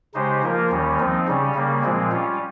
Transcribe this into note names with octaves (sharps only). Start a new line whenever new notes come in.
C#3 G#3 D#4 G4 C5
F3 A#3 F4 A#4
D#2 D#3 G3 C#4
F3 C4 D#4
C#3 G3 C#4
C#3 G3 A#3
A#2 F3 G#3 C4
G3 C#4 F4